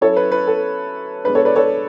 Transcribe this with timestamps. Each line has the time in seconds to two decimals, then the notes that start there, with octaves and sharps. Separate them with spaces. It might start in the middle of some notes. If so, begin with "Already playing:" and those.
0.01 F#3 C#4 E4 A4 C#5
0.16 B4
0.32 B4
0.47 A4
1.24 B2 G#3 D4 B4
1.35 A4 C#5
1.45 B4 D5
1.56 A4 C#5